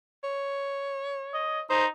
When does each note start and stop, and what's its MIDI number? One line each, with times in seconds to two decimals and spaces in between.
0.24 1.62 73
1.34 1.61 75
1.70 1.86 63
1.70 1.85 72